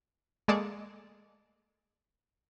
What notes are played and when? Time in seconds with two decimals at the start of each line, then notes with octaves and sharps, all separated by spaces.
0.48 G#3 A#3 A4 D5 C#6 D#6